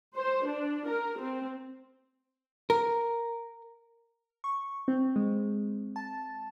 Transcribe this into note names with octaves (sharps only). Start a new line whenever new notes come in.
C5
D4
A#4
C4
A#4
C#6
C4
G#3
A5